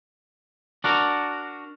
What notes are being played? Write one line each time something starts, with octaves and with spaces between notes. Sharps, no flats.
D4 F#4 A#4